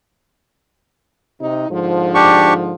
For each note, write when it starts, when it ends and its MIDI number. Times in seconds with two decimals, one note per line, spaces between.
1.41 1.69 48
1.41 1.69 63
1.70 2.75 44
1.70 2.75 50
1.70 2.75 53
2.15 2.54 62
2.15 2.54 67
2.15 2.54 85